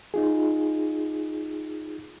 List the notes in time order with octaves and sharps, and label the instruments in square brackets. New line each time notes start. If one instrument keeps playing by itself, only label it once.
[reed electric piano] D#4 F4 G#4